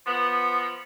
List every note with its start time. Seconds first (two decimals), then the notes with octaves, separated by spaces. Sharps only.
0.07 F3 B3